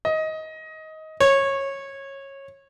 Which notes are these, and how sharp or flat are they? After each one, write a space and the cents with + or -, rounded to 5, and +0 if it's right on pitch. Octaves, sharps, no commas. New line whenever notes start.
D#5 +15
C#5 -20